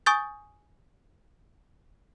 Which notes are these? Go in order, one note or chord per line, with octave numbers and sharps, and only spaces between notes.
G#5 C#6 D#6 G6 A6